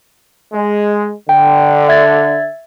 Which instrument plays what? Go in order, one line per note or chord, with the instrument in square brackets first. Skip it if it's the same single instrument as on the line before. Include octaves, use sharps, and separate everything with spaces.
[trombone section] G#3
[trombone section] D3 [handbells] G5
[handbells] E5 G#6 A6